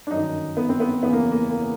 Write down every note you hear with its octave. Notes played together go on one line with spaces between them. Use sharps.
D4
G1 F#2 D#3 D#4
B3
C4
B3
F#1 E2 C#3 E3 B3
A#3
A#3
A#3